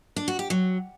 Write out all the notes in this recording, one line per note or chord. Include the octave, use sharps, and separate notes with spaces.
D4
F#4
G4
F#3